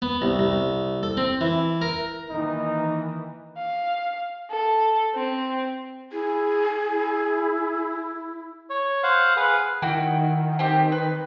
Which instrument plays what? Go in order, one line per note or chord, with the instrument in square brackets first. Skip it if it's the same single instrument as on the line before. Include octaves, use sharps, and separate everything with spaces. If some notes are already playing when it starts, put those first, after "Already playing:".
[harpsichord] B3
C2
C2
A4
C4
E3
A#4
[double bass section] D#3 E3 A#3 [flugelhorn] D#4
[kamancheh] F5
A4
C4
[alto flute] E4 [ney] G#4
[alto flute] E4
[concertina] C#5
C5 F5 F#5
G#4 B4 F5 F#5
[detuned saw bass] D#3 [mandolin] E4 F#4 G5
[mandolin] C4 G4
B4